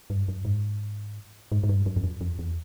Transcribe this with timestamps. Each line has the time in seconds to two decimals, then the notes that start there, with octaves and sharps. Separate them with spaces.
0.10 G2
0.28 F#2
0.45 G#2
1.52 G#2
1.63 G#2
1.69 G2
1.86 F#2
1.96 F2
2.04 F#2
2.21 F2
2.39 E2